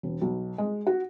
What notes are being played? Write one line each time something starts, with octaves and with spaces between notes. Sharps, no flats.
E1
B1
G#3
F#4